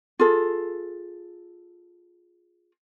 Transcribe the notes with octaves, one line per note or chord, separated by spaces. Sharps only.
F4 G#4 A4